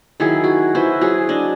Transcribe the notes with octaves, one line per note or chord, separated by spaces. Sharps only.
D#3 F#3 E4 G#4
F#4
E4 F#4 B4 C5
F#3 G#4
D4 D#5